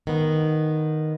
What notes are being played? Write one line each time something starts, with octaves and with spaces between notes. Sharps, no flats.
D#3 B3